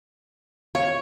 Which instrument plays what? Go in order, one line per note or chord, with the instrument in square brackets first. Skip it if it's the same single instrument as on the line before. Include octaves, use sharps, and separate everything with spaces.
[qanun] C#5 [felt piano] F5